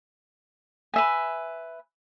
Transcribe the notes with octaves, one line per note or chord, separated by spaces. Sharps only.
B4 E5 G#5